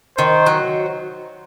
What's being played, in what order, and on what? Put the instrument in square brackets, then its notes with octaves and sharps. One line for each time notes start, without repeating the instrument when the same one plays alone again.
[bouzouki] D#3 [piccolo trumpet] C5
[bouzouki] F#3